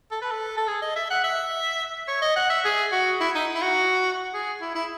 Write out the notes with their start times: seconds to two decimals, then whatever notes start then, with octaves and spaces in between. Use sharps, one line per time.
0.11 A4
0.22 B4
0.31 A4
0.57 A4
0.68 G#4
0.82 D#5
0.96 E5
1.10 F#5
1.24 E5
2.08 C#5
2.22 D#5
2.36 F#5
2.50 E5
2.65 G#4
2.92 F#4
3.20 E4
3.35 D#4
3.55 E4
3.62 F#4
4.34 G#4
4.61 E4
4.75 E4